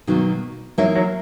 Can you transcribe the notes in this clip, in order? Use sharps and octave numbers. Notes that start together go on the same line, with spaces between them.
B2 D#3 F#3 A#3
E3 F#3 A#3 D#4 A#4 E5
F#3